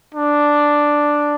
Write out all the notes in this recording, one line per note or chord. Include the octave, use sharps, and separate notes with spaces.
D4